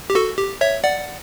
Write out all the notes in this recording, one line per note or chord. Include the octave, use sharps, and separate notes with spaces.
G4
F#4 A4
G4
C#5 E5
D5 F#5